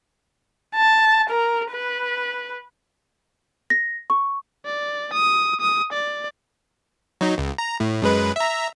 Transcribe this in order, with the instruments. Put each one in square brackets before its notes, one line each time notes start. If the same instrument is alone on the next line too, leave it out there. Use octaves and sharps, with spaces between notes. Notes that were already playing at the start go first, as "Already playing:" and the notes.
[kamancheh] A5
A#4
B4
[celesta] A#6
C#6
[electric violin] D5
D#6
D#6
D5
[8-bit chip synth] F#3 D#4
C#2
A#5
A2
F#2 G#3 B4
E5 A#5